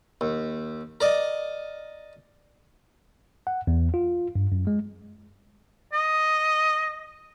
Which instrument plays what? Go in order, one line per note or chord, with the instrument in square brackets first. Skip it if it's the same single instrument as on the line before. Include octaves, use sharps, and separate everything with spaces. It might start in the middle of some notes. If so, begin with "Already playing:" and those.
[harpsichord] D#2
A#4 D5 D#5
[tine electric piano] F#5
E2
F4
G2
F#2
G#3
[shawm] D#5